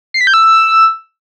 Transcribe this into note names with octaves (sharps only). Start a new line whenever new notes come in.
C7
B6
G6
E6